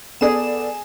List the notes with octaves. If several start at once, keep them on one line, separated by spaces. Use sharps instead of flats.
B3 G#4 A4 D5 E7